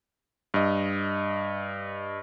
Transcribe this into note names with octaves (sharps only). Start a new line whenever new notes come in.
G2 D#5